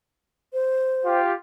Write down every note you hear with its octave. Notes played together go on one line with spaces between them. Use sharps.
C5
F4 G4